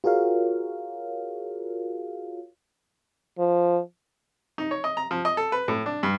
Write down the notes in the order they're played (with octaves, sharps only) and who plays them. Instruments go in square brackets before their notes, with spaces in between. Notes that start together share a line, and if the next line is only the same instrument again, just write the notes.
[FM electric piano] F4 F#4 G#4 A#4 C#5 F5
[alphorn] F3
[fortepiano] D#4
C#5
D#5
A#5
F3
D#5
A4
B4
A2
D4
G2